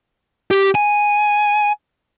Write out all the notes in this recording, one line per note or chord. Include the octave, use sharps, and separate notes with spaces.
G4
G#5